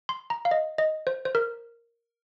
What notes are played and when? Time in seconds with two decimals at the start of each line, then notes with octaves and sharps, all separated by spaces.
0.09 C6
0.30 A#5
0.45 F5
0.51 D#5
0.78 D#5
1.07 C5
1.25 C5
1.35 A#4